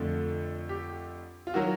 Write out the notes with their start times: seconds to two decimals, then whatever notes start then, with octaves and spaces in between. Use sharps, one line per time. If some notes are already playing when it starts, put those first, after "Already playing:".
Already playing: F2 D3 F3 A3
0.69 G4
1.47 F4
1.54 D#3 F#3 F#4